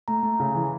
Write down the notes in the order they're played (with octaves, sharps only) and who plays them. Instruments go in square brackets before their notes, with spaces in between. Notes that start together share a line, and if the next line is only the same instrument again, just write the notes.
[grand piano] A3 [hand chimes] A#5
[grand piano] A3
C#3
E3